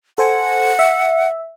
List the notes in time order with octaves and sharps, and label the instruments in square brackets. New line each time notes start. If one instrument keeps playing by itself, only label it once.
[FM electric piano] A4 C5 G#5 [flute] F#5
[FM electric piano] E5